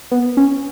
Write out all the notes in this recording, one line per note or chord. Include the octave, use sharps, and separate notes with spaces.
B3
C#4